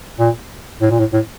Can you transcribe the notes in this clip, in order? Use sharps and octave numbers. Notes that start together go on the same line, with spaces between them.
A#2
A2
A#2
A2
A2